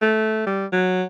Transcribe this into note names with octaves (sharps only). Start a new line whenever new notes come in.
A3
G3
F#3